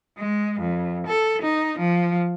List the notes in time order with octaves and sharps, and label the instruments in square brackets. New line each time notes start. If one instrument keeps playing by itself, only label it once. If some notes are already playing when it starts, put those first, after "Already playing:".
[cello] G#3
F2
A4
D#4
F3